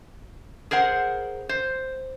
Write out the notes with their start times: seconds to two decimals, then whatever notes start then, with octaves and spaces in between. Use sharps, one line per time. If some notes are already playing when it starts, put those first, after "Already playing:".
0.71 G#4 A#4 C5 F#5
1.49 C5